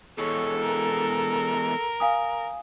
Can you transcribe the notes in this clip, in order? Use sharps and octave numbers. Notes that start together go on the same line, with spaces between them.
E2 G#3 A4 C#5
A#4
F5 G#5 D#6